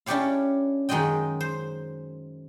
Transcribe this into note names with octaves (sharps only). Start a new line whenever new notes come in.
C#4 D4 E4 G4 C#5 F5
F#2 D#3 G#3 F#4 D#5 G5
C5